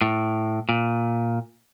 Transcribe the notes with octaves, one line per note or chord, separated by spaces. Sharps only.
A2
A#2